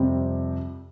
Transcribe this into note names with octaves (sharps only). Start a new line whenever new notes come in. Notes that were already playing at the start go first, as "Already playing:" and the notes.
Already playing: F2 C3 G3 C4